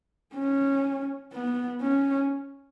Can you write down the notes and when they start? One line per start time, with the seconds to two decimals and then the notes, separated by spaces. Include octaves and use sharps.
0.34 C#4
1.33 B3
1.82 C#4